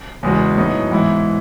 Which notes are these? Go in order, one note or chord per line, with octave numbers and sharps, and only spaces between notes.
E2 C#3 G#3 B3 F#4
A2 F#3 B3 D#4 F#4
G#2 E3 B3 E4